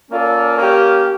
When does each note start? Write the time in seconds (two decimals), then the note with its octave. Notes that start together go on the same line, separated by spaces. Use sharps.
0.11 A#3 C#4 F4 A4 D5
0.59 A#3 C#4 G4